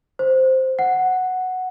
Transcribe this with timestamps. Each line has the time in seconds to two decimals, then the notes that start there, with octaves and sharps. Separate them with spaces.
0.19 C5
0.79 F#5